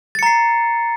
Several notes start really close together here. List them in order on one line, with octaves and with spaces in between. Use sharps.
A6 C#7 A#5 C7